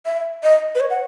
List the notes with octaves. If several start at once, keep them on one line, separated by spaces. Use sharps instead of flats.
E5
D#5
B4
C#5
F#5